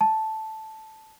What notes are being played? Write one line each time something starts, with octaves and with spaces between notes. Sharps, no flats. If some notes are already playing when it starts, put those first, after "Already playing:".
A5